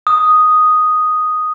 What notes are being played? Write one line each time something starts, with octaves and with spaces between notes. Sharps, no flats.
D#6